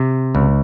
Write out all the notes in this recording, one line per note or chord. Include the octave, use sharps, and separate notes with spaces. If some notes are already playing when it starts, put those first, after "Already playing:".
Already playing: C3
C#2